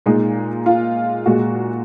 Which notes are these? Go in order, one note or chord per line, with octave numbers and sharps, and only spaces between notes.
A#2 G#3 D#4
F4
A#2 G#3 F#4